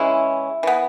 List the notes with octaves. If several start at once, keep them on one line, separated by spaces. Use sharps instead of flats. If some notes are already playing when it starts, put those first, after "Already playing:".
Already playing: C#3 E3 G#3 C#4 E4
E3 B3